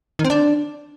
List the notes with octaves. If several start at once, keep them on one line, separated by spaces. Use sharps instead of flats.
D#3
C4
D4